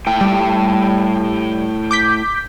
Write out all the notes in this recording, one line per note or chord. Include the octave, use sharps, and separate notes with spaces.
A2 G5
G3
D6 G6 B6